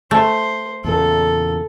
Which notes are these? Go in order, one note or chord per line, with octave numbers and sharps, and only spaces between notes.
A3 C5
E2 A#2 C#3 A4